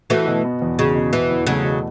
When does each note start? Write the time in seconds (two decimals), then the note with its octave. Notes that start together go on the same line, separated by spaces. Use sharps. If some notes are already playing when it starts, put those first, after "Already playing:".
0.10 E3 A3 F#4
0.27 B2
0.45 B3
0.62 E2
0.79 C#3 F#4
0.95 B2
1.13 E3 B3
1.31 E2
1.47 C#3 F#3 A3
1.65 B2